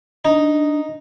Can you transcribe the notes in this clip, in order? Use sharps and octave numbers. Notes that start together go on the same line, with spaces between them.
D4 D#4